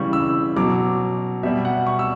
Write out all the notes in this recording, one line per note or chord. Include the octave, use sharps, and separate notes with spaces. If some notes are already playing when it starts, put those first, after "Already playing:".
Already playing: C#3 E3 G3 C#6
E6
B2 F#3 D6
B2 G3 E5
F#5
C#6
E6